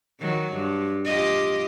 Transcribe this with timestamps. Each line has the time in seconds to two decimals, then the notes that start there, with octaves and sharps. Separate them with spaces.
0.20 D#3 F#3
0.53 G2
1.05 F4 G4 D#5